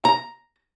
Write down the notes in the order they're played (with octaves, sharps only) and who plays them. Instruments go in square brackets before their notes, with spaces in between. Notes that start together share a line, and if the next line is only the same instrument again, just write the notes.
[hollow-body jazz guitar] A#5